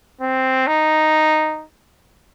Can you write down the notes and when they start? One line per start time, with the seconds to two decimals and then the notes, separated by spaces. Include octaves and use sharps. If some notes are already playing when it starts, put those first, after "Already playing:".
0.21 C4
0.67 D#4